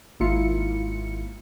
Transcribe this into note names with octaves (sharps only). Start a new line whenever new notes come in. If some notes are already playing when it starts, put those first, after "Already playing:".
G#1 A#3 E4 F4 C#7